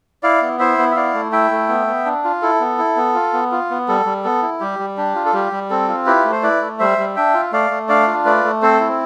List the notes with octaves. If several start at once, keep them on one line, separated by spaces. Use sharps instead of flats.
E4 D5 F5
B3
E4 C5 E5
B3
E5
E4 D5 F5
A3
E4 E5 G5
A3
B3
B3
D4
F4
E4 A4
B3
E4
B3
F4
B3
F4
B3
G3 A4
G3
B3 A4
E4
G3 G4
G3
D4 G4
F4
A4
G3 G4
G3
C4 A4
F4
E4 G4 B4
A3
C5
E4 B4 D5
A3
G3 C5 E5
G3
D4 E5 G5
F4
A3 D5 F5
A3
D4 D5 F5
F4
A3 B4 D5
A3
C4 A4 C5
E4